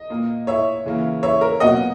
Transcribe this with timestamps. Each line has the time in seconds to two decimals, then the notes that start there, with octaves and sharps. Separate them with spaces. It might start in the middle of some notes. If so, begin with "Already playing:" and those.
Already playing: D#5
0.10 A#2 A#3
0.47 C#5 E5
0.85 C#3 E3 A#3
1.23 C#5 E5
1.41 A#4
1.60 B2 F#3 A#3 D#5 F#5